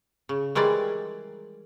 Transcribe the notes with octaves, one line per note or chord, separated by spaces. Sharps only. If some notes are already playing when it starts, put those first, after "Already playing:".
C#3
D#3 E3 G3 G#3 D5